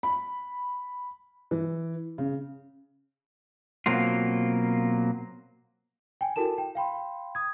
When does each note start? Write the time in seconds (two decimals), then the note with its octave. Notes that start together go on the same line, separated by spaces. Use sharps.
0.03 B5
1.51 E3
2.18 C#3
3.86 B2 F#3 A#3 C4 F4
6.21 G5 G#5
6.36 E4 F#4 A4 A#4 A5 E7
6.58 G5
6.75 F5 G5 B5 C6
7.35 D#6 G#6